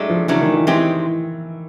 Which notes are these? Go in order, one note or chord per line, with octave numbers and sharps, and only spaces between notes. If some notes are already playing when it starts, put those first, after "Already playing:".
Already playing: A2 F#3 G#3 A3 D4
F3
C#3 E3 F#3 A3 D4
D#3
E3
E3 G#3 C4 D#4 G4